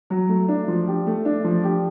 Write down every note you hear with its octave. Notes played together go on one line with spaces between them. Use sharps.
F#3
A3
D4
F3
G4
A3
D4
F3
G4